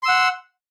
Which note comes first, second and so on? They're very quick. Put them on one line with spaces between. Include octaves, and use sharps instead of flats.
C6 E6 F#5